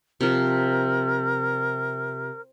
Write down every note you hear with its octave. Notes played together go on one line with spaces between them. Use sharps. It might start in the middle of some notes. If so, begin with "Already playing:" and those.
C3 F3 A#4